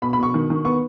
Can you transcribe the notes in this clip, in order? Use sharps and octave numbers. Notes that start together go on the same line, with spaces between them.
B2 B5
B5
B2 C#6
D#3
D#3
B3 C#6